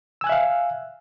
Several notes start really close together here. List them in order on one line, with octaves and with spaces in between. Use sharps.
E6 G#5 F#6 E5 F5